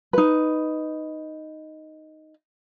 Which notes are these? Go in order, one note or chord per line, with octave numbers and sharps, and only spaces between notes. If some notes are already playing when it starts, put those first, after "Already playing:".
D#4 B4